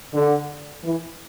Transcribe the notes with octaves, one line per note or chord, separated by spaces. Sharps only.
D3
E3